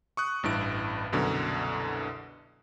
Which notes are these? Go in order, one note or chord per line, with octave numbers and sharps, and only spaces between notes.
C#6 D#6 F#6
A1 G2 E4 D7
C2 F#2 B2 D3